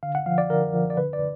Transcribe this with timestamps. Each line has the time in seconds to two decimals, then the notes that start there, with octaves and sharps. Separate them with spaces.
0.03 D3 F5
0.15 F#5
0.26 F3 F5
0.38 D5
0.50 D3 A#4
0.74 F3
0.90 D5
0.97 D3 B4
1.13 D5